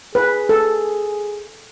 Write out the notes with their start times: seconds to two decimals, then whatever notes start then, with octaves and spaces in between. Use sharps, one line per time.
0.15 G#4 B4
0.49 A4